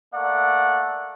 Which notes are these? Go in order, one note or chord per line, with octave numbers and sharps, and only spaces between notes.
A3 A#3 D5 F#5